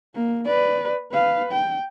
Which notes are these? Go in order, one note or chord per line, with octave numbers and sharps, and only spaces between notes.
A#3
B4 D5
B4 F5
G5